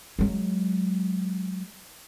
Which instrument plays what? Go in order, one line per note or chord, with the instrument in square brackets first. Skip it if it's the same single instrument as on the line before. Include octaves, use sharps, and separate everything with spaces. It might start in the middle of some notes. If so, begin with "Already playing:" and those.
[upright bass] F#3 G#3